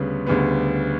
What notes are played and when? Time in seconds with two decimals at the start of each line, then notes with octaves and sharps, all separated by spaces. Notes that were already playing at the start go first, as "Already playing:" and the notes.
Already playing: D2 C#3 G3 B3
0.27 D2 C#3 G3 B3